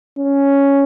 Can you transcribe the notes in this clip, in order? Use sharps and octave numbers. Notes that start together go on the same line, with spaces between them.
C#4